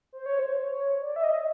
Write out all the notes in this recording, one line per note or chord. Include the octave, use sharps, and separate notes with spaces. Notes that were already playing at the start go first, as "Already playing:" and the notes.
C5
C#5
C5
C#5
D5
E5
D#5